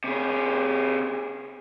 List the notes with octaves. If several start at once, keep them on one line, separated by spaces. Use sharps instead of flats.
C3 G#4